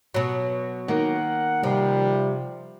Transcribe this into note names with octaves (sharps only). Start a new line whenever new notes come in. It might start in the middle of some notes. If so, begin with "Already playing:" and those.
B2 F#3
D#3 A#3 F#5
C3 F3 G3